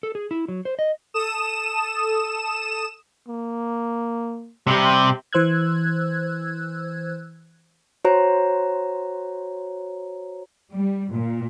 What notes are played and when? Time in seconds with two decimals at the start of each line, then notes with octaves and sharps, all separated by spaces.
0.03 A4
0.15 G#4
0.31 E4
0.48 F#3
0.65 C5
0.79 D#5
1.14 A4 D#6 E7
3.28 A#3
4.67 C3 G3 G4
5.33 E3 C5 E6 F#6 G#6
8.05 F#4 C5 C#5 A#5
10.74 G3
11.14 A#2